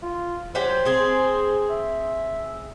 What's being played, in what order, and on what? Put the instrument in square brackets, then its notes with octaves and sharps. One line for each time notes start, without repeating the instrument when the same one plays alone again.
[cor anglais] F4
[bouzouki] F#3 G4 G5 [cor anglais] C5
[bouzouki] C4 G#4
[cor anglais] E5